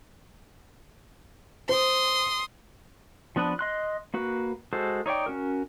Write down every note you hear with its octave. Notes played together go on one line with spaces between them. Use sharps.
C5 C6 D#6
F3 B3 D4 B4
D#5 C6 F#6
A#3 F#4 B4
G#3 F#4 A4 C5
D#4 C#5 D5 G5
C#4 F#4 A#4